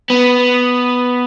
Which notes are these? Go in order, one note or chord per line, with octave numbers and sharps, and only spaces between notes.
B3